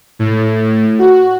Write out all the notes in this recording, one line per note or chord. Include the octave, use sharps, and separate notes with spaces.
A2
F#4